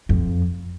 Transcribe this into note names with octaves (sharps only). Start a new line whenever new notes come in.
F2